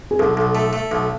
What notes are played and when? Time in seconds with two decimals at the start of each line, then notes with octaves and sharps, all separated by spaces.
0.11 G#4
0.19 B1 A4
0.37 B1
0.55 A3
0.73 A3
0.91 B1